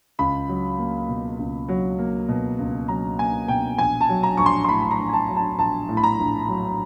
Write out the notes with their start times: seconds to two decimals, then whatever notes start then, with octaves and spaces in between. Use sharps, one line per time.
0.19 C#2 B5
0.48 F#3
0.79 A#3
1.09 B2
1.39 C#2
1.68 F#3
1.99 A#3
2.28 B2
2.59 C#2
2.88 F#3 A#5
3.18 A#3 G#5
3.48 B2 G5
3.78 A#1 G#5
4.01 A5
4.09 F#3
4.23 A#5
4.37 A#1 C#6
4.46 C6
4.64 C6
4.69 A2 B5
4.82 B5
4.91 A#5
4.99 A#1
5.09 G#5
5.13 A5
5.28 F#3
5.36 A5
5.58 A#1 A5
5.89 A2
5.97 B5
6.03 A#5
6.19 A#1
6.48 F#3